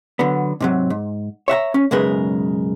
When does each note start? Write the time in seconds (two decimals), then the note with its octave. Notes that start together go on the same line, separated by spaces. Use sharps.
0.19 D3 F#3 B3
0.60 G#2 C3 F#3
0.90 G#2
1.48 C#5 E5 F#5 A#5
1.74 C#4
1.91 B1 F#2 C#3 G#3 A#4 B4